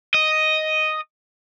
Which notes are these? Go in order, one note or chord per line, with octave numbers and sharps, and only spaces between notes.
D#5